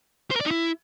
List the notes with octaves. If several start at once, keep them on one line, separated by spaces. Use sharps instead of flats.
C5
A#4
D5
D#4
E4